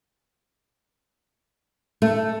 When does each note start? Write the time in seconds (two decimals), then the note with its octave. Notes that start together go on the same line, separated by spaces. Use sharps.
2.02 A3